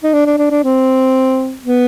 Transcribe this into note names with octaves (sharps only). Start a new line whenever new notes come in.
D#4
D4
D4
D4
D4
C4
B3